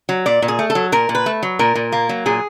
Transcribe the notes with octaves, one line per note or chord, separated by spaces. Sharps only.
F#3
A#2 D5
A#2
G#4
A3
A4
F#3
A#2 A#4
A#2
B4
A3
F#3
A#2 A#4
A#2
A#3
F#3
A#2 G#4